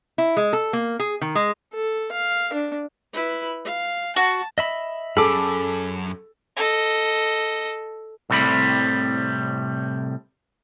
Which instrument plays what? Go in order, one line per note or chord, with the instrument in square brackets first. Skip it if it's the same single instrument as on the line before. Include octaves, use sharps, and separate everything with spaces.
[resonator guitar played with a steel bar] E4
G#3
A4
A#3
G#4
D#3
G#3
[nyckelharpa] A4
F5
D4
[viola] E4 B4
F5
[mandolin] F#4 [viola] A5
[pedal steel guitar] D#5 E5 B5
[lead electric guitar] F#2 C#4 [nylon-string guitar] G#4 [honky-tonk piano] A4 [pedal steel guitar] B5 D6
[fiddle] A4 D#5
[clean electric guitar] C2 A2 C3 G3 B5